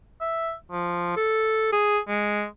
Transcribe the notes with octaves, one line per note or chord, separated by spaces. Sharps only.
E5
F3
A4
G#4
G#3